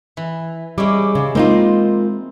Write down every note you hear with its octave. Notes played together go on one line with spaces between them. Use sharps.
E3
G3 G#3 C#4 E4 D6
C#3
G#3 A#3 C4 D#4 F4